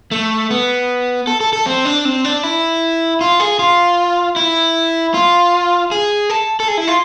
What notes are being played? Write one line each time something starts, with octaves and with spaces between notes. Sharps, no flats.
A3
B3
A4
A4
A4
C4
D4
C4
D4
E4
F4
G#4
F4
E4
F4
G#4
A4
A4
G#4
E4
F4